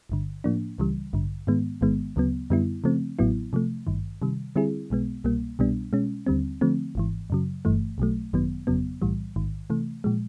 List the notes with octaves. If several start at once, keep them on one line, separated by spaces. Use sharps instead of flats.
G1 G2 D3
A2 F3 A#3 D4
C#2 C#3 E3 G3
A1 G2 D3
G#2 D#3 G#3 B3
A1 G#2 D#3 G#3 B3
D2 C#3 F#3 B3
F#2 D3 G3 B3 E4
C#3 F3 A3 C4
A1 A2 F#3 B3 E4
C3 F3 A3
G#1 G2 D#3
C3 D#3 G3
D3 G3 C4 E4 G#4
B1 B2 G#3 B3
C2 B2 G3 A#3
C2 B2 G3 B3 D4
B2 G#3 C#4
D#2 D3 G3 C4
D3 F3 A3 C4
G#1 G#2 E3
F#2 C#3 F#3
G1 G2 E3 A3
B1 B2 F#3 A3
G#1 F#2 D#3 F#3 B3
G1 F2 C#3 F#3 B3
B1 A2 E3 G3
A1 G#2 D#3
C3 E3 A3
A#2 F3 G#3